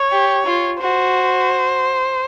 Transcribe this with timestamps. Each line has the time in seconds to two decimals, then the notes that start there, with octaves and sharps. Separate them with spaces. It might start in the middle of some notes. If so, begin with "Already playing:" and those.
Already playing: C#5
0.12 G4
0.46 F4
0.80 F#4 C5